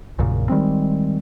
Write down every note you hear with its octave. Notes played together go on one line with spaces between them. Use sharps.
A#1 F#2 A#2 C#3
D#3 G3 G#3 C4